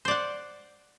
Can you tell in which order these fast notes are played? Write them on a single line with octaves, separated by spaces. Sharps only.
C5 D5 F#5